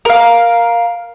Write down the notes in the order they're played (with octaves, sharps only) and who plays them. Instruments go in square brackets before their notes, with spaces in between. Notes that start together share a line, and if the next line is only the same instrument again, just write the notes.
[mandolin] A#4 F5